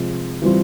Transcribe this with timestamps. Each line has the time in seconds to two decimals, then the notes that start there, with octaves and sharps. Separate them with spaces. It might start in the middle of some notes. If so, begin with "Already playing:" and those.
Already playing: C3 F3 G#3
0.42 E3 G3 C4 F4